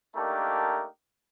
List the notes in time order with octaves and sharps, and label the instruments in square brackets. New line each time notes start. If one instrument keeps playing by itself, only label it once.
[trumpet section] A3 A#3 D4 D#4 G4 A#4